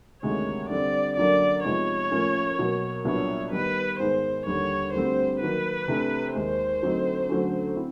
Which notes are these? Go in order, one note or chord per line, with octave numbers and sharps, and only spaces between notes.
D2 C3 D#3 G#3 C#5
D3 G3 C4 D5
F#2 D3 F#3 A#3 D4 D5
C3 F3 G#3 B3 D#4 C#5
A2 F3 A#3 C#4
B2 F#3 A#3
C2 A#2 F#3 B3 D4 C#5
D#3 G3 B3 D#4 B4
G#2 D#3 G#3 B3 C5
D#2 D3 G3 C#5
D2 D3 G3 C4 C5
D#3 F#3 A#3 B4
C3 E3 A3 D4
D#2 D#3 G#3 C5
D3 F#3 A3 C4 D#4
D3 F#3 A3 C#4
C4 E4